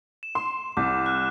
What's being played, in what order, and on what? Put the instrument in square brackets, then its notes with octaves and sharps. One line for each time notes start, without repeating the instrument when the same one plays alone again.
[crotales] E7
[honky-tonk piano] C6
[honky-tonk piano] C2 [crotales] D6 G6
[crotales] F6 F#6